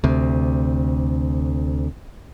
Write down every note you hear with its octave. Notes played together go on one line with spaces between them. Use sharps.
D2 C3